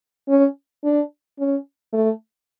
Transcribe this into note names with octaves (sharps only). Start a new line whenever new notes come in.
C#4
D4
C#4
A3